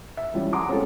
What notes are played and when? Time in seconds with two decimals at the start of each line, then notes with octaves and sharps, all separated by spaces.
0.17 E5
0.34 E3 F3 G3 C#4
0.53 F#5 G#5 A#5 C6 D6 D#6
0.68 G#3 C4 C#4 F4 G4 A4